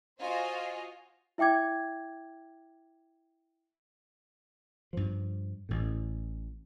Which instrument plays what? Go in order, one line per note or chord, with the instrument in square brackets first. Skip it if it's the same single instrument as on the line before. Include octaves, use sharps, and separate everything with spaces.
[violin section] F4 F#4 C5 D#5 F5 G#5
[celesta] E4 E5 G5 D6 G#6
[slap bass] G2 F3
A1 A2